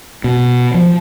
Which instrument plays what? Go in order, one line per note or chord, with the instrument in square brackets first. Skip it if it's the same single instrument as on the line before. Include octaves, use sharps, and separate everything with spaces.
[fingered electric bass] B2
F3